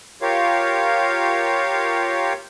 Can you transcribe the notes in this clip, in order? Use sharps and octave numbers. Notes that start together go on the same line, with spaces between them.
F4 G4 A#4 C#5 F5